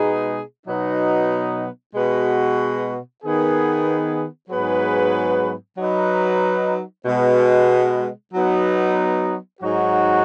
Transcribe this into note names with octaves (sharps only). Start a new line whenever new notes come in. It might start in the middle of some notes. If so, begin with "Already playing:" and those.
Already playing: B2 G#3 B3 D#4 G#4
B2 F#3 B3 D#4
B2 G#3 B3 F#4
D#3 B3 G#4
G#2 F#3 B3 G#4 B4
F#3 D#4 B4
B2 G#3 B3
F#3 B3 D#4
G#2 F#3 D#4 F#4